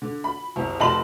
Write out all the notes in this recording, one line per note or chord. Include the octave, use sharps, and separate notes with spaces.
D3
B5
F#1 C2
F1 D#5 A5 B5 C6 F#7